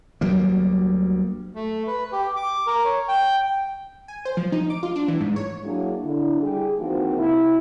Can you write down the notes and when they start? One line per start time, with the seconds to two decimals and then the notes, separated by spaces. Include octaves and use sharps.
0.21 D2 F#3 G3 A#3
1.55 A3
1.87 B4
2.12 G4
2.36 D6
2.67 A#4
2.85 C#5
3.08 G5
4.08 G#5
4.25 C5
4.37 F3
4.52 D#4
4.70 D6
4.83 F4
4.96 D4
5.08 E3
5.20 G#2
5.36 C#5
5.64 F#3 A#3 D4 E4 F#4 G#4
6.04 D3 E4
6.41 G3 G4 G#4
6.79 E3 F3 A#3 C4 D#4 F#4
7.17 C3 E4